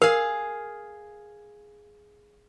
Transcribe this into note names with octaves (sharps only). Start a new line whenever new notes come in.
G#4 A#4 F5